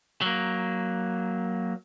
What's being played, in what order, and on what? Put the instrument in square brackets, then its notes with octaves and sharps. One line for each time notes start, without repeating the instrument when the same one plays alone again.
[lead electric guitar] F#3 A#3